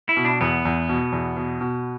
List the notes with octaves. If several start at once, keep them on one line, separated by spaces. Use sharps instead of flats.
E4
B2
D4
E2 B3
E2
B2
E2
B2
B2